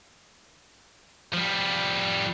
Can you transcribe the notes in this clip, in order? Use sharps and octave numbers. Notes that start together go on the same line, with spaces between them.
F3 G3